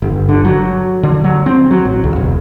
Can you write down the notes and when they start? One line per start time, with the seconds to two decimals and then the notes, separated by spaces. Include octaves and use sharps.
0.02 G1
0.29 D3
0.45 F#3
1.03 D3
1.24 F#3
1.46 C4
1.71 F#3
1.85 A1
2.04 C#2
2.16 E1